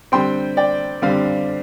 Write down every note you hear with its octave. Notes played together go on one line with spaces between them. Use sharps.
D3 G3 C4 G5 C6
D5 G5
D3 G3 C4 F5